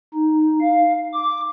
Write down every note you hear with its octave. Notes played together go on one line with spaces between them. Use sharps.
D#4
F5
D6